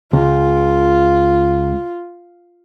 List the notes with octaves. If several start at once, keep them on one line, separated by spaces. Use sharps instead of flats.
C#2 F4